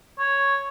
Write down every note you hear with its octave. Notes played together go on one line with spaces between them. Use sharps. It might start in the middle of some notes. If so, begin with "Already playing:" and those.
C#5